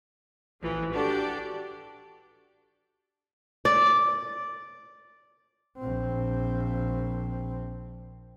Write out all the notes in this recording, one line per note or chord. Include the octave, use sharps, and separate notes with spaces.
A1 E3 F3
D4 F#4 G4 A4 D5
D5
A#1 C4